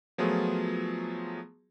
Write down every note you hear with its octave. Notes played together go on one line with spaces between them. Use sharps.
F3 F#3 A3 B3 F4 G#4